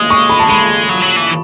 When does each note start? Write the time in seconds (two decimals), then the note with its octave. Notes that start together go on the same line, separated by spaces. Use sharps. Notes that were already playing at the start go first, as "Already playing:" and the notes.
Already playing: G#3 D#6
0.10 C#6
0.29 B5
0.39 A5
0.49 G#3 B5
0.89 F#3
1.02 F#3
1.16 E3